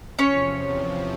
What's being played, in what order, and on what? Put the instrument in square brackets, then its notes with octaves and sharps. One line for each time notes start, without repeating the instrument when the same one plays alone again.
[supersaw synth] E2 C3 F3 [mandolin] C#4 C#5